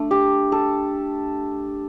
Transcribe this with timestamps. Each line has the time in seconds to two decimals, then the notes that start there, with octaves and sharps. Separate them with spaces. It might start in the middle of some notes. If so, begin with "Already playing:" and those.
Already playing: A3 D4
0.11 G4
0.52 A4